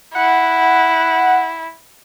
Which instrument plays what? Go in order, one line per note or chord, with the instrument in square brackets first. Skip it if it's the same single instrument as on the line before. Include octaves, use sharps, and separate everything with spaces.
[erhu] E4 [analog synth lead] F#5